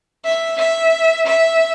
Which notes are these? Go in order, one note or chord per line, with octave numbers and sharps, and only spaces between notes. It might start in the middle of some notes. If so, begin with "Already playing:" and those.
E5
E5
E5